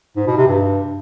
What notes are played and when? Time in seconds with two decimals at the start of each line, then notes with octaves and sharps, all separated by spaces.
0.16 G#2
0.27 B2
0.37 C3
0.48 G2